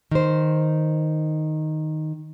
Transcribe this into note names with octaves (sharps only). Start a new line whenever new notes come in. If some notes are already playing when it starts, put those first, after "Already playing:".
D#3 C5